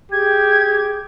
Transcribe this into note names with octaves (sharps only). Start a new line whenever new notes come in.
G4 G#4 G#6